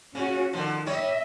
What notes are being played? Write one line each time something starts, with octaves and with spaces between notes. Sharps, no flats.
C#3 C#4 F#4
D3 D#3 F3
G3 C#5 D#5 E5